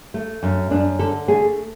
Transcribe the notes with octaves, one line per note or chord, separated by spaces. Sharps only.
A3
F#2
F#2 D4
D3 A4
A3 G#4